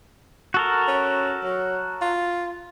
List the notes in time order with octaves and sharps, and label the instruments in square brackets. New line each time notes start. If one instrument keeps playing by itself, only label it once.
[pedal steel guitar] F#4 A4 A#4
[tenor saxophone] C#4
F#3
F4